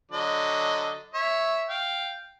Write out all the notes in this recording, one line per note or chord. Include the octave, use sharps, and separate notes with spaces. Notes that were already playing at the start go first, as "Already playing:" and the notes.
D3 F#3 D#5
C#5 E5
F5 G5